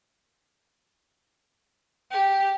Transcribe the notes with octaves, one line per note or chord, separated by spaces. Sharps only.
G4